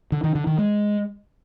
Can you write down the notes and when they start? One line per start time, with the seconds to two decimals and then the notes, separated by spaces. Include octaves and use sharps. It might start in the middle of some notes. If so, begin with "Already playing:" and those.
0.12 D3
0.24 D#3
0.35 D3
0.47 D#3
0.58 G#3